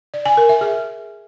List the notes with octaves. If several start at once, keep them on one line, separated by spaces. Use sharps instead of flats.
D5
G#5
A#4
E5
G#4